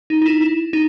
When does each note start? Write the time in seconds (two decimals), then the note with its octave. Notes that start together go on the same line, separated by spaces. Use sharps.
0.10 D#4
0.22 D#4
0.26 E4
0.41 E4
0.73 D#4